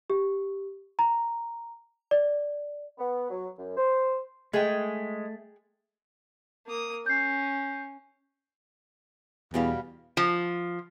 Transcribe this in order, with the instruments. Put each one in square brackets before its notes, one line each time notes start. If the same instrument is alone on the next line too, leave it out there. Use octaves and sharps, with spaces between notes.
[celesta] G4
A#5
D5
[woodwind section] B3
F#3
F#2
C5
[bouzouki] G#3 [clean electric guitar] A3 [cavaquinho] G#4 G5
[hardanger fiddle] A#3 D#6
[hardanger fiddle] C#4 [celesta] G6 C7
[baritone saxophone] E2 [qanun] B2 G3 F5
[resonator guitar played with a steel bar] F3